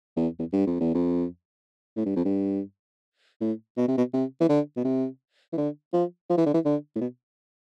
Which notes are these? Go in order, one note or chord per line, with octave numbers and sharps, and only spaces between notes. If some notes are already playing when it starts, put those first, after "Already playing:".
E2
E2
G2
F2
E2
F2
A2
G2
F2
G2
A2
B2
C3
B2
C3
E3
D3
B2
C3
E3
D3
F3
F3
E3
D3
E3
D3
A2
B2